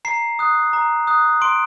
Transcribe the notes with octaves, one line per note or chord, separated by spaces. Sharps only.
A#5 C7
D#6 F#6
A#5
D#6 F#6
C6 D7